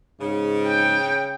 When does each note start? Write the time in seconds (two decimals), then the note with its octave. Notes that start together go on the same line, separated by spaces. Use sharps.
0.20 G#2 C#3
0.67 G5